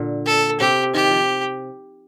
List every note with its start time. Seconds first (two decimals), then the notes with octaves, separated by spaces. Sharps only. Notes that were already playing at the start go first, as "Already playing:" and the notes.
Already playing: A#2 D3
0.26 A4
0.60 C3 G4
0.94 D#3 G4
1.11 F3